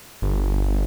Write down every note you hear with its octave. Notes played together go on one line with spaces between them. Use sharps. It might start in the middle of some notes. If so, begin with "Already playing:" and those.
G1